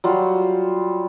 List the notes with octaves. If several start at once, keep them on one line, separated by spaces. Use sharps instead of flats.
F#3 G3 F4